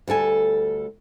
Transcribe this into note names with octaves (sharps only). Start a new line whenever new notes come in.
D2 G3 A4 G#5